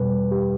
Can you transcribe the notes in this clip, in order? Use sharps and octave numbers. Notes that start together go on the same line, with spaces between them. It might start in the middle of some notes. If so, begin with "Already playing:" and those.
Already playing: E2 B2 G3 B4
G4